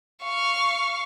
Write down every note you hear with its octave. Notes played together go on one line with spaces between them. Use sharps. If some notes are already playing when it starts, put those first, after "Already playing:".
F5 C#6